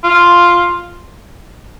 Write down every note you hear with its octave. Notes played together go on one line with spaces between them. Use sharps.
F4